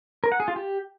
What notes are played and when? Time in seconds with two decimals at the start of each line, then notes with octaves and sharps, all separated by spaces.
0.24 A#4
0.32 F#5
0.40 G#4
0.48 F4
0.56 G4